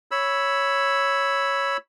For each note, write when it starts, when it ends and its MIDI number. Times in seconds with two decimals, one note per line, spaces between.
0.11 1.77 73
0.11 1.77 83
0.11 1.77 88